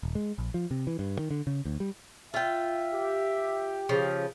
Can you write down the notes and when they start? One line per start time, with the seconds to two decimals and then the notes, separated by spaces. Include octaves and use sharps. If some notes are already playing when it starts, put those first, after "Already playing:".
0.03 D#1
0.15 G#3
0.38 A#1
0.54 F3
0.71 C3
0.87 E3
0.99 G2
1.19 D#3
1.31 D3
1.47 C#3
1.65 D2
1.80 G3
2.34 F4 E5 G5
2.93 G4
3.89 C#3 F3